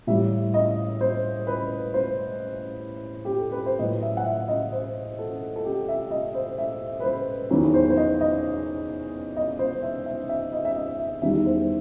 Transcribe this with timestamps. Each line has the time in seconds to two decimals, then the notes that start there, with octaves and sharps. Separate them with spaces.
0.07 A2 E3 G3 E5
0.54 D#5
1.01 C5
1.47 B4
1.94 C5
3.25 G4
3.38 A4
3.52 B4
3.66 C5
3.79 A2 F#3 D#5
4.02 E5
4.17 F#5
4.26 E5
4.48 D#5
4.72 C5
5.19 A4
5.56 A4
5.65 G4
5.88 E5
6.11 D#5
6.35 C5
6.58 E5
7.00 B4
7.04 C5
7.50 E2 D#3 F#3 B4
7.74 C5
7.90 C5
7.97 D#5
8.21 D#5
9.37 D#5
9.59 C5
9.83 E5
10.06 E5
10.29 E5
10.52 D#5
10.65 E5
10.76 D#5
10.99 E5
11.22 E2 D#3 G3 E5
11.46 C5